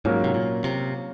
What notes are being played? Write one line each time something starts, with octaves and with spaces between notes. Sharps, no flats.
G#2 F#3 A#3 C#4 F4 A#4
C3
A#2
C3